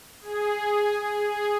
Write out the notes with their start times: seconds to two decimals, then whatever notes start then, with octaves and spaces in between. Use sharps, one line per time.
0.21 G#4
1.15 G#4